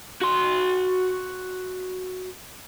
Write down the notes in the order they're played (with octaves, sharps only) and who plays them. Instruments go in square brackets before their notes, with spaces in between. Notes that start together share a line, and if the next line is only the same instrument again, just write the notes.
[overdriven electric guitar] F#4 C6